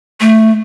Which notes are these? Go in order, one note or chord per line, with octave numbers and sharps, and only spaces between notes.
A3